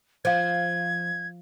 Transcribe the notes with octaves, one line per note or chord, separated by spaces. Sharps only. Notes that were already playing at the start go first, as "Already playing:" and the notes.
F3 C5 F5 G#6